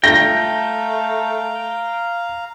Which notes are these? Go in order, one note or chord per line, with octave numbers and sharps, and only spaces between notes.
A3 F5 G5 A#5 A#6